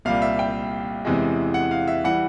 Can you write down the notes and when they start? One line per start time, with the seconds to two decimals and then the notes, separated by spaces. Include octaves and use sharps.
0.05 C2 A#2 G3 F5
0.22 E5
0.39 G5
1.05 E2 C3 E3 G#3
1.54 F#5
1.71 F5
1.88 E5
2.04 E3 G3 F#5